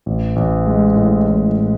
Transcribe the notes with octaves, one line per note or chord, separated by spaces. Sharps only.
A1
A1
G#3
A2
A1